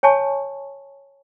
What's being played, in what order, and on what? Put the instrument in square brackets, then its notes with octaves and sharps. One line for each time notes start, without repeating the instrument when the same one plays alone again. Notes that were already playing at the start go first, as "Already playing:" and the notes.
[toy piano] C#5 G#5 A5 C#6